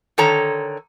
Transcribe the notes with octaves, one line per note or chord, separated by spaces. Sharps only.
D3 D#3 A4 C#5 A#5